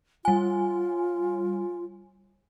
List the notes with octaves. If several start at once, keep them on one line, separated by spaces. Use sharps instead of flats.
G3 F4 G#5